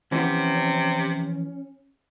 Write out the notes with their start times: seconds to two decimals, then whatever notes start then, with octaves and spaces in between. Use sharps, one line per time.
0.12 C3 E3 F3 B3 C#4